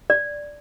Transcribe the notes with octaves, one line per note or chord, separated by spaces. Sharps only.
D5